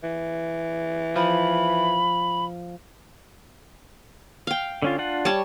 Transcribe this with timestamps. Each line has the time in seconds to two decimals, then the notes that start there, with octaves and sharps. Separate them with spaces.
0.03 E3
1.16 F3 B5
4.47 F5 G5
4.82 D3 C#4 F4
4.98 D4 F4 F#5
5.25 G3 C#5 A5